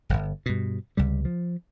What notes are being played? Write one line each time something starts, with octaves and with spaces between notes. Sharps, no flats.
D1 G1
G2 B2
C#2 C3 G3
F3